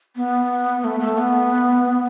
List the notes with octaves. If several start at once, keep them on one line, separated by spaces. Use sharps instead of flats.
B3
A3
A3
B3